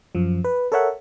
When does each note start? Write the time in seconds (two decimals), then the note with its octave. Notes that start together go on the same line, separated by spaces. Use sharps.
0.15 F#2 F3
0.44 B4
0.72 A4 A#4 C#5 E5 F#5